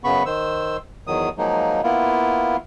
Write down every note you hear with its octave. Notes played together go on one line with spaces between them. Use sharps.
F#2 C#3 B3 B5 C#6
D#3 C5 E6
E2 D#3 F#3 D#6
F3 F#3 G#3 A#3 D#4
A#3 B3 E4 F4